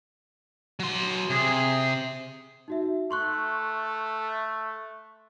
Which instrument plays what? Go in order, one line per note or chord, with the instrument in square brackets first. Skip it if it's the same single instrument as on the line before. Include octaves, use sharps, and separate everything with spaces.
[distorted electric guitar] F#3 C6
[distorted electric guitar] C3 [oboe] G#4
[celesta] D#4 F#4 E5
[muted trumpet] A3 [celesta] C6 C#6 F#6